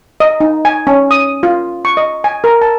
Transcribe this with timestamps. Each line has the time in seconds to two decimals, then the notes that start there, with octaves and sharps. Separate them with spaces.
0.20 D#5
0.40 D#4
0.65 G#5
0.87 C#4
1.11 D#6
1.43 F4
1.85 C#6
1.97 D#5
2.24 G#5
2.44 A#4
2.62 A5